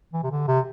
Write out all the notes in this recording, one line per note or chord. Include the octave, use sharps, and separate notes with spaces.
E3
C3
D3
C3